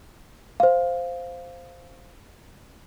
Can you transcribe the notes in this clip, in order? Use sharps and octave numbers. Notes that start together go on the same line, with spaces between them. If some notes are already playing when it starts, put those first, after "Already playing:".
C5 F5